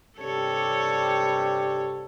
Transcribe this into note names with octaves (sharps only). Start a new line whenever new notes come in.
G2 C3 G3 A4 C#5